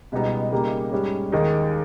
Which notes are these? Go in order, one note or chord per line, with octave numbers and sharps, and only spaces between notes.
C#2 B2 G3 B3 D#4
C#3 G3 A#3 D#4 G4
G#2 G3 C#4
D#2 D#3 G#3 D#4 G#4